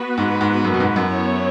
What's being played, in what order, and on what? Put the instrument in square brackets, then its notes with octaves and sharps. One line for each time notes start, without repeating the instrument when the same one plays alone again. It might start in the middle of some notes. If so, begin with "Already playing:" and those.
Already playing: [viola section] B3 F#4 B4
[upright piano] G#2
G#2
F#2
B2
G#2
F#2
[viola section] B3 E4 C#5